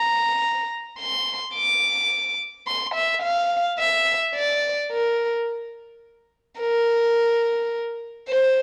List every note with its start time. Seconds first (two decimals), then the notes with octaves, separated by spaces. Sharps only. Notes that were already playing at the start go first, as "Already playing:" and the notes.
Already playing: A#5
0.99 C6
1.55 D6
2.67 C6
2.95 E5
3.22 F5
3.79 E5
4.35 D5
4.91 A#4
6.60 A#4
8.29 C5